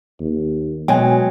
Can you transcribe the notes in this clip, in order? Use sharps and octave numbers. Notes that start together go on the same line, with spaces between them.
D#2
B2 F#3 G#3 G5 G#5